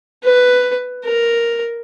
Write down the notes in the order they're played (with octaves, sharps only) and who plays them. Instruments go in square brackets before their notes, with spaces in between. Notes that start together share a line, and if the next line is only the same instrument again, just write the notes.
[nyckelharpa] B4
A#4